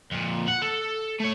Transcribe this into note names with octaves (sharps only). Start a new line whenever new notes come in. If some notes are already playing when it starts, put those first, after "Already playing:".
F2 A#2
F#5
A4
A3 C#5